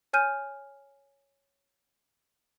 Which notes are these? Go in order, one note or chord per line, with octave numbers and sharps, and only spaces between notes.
C#5 G#5 F6 G6 D#7